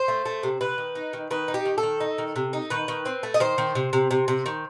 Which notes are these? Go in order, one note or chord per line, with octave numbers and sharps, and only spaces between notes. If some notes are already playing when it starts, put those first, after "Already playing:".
Already playing: C5
A3
A3
C3
C3 B4
D#3
D#4
D#3
D#3 B4
D#4
G4
D#3
A4
D#3
D#4
D#3
C3
D#4
D#3 B4
D#3
C4
A3
D#5
D#3 C5
D#3
C3
C3
C3
C3
D#3